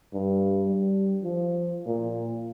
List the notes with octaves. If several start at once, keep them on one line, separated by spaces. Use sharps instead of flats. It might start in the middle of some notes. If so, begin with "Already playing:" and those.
G2
G3
F3
A#2